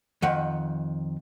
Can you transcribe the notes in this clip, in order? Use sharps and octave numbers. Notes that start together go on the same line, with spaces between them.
F2 D#3 F#5